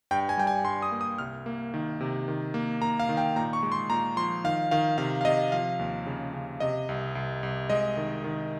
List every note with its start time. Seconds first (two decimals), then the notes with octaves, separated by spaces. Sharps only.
0.11 G2 G5
0.29 G#5
0.37 G3 G5
0.47 G#5
0.64 G2 C6
0.82 D#6
0.91 A#3
1.01 D#6
1.18 C2 F6
1.46 A#3
1.74 D#3
2.00 C3
2.28 D#3
2.54 A#3
2.82 A#3 A#5
3.00 F5
3.09 D#3
3.17 G5
3.36 A#2 A#5
3.53 C#6
3.63 G#3
3.72 C6
3.90 A#2 A#5
4.17 F3 C6
4.44 D#3 F5
4.71 D#3 F5
4.98 C3 F5
5.21 F5
5.25 C3 D#5
5.52 F3 F5
5.79 D#2
6.07 C#3
6.34 C#3
6.60 C3 D#5
6.89 C2
7.15 C2
7.43 C2
7.70 G#3 D#5
7.97 D#3
8.24 D#3